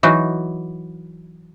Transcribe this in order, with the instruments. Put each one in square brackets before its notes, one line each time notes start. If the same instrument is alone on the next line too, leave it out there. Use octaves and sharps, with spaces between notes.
[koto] E3 F#3 D#4 F#4